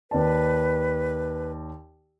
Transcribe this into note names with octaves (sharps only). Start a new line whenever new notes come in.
D#2 B4 D5 A5